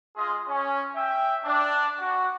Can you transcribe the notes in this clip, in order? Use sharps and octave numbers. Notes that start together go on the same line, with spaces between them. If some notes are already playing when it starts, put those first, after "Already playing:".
G#3 F4 G#4 D#5
C#4
E5 G5
D4
F#4